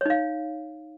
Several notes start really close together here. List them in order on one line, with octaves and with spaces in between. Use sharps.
C#5 D#4 F5